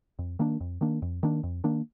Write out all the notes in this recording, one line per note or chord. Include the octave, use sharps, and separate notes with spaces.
F2
D#3 A#3 D4
F2
D#3 A#3 D4
F2
D#3 A#3 D4
F2
D#3 A#3 D4